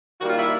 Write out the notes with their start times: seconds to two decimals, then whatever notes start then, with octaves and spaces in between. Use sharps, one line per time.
0.21 D#3 G3 A#3 F#4
0.30 F4
0.39 E4